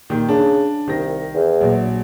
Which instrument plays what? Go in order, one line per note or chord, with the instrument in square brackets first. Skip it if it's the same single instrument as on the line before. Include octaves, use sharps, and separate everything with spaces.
[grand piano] A#2 D#3 G4
[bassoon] C#3 [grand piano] D4
[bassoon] C2 [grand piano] D#3 A#6
[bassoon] E2
[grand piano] A#1 F#3